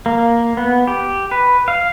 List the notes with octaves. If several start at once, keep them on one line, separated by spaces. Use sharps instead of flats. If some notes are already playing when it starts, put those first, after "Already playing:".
A#3
B3
G4
B4
F5